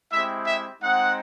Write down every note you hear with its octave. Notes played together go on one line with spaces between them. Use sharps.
G#3 C4 E4 G4 E5
E5
G#3 C4 D#4 F#5